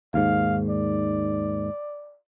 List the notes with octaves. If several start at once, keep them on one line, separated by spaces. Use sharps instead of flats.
D#2 G#2 F5
D5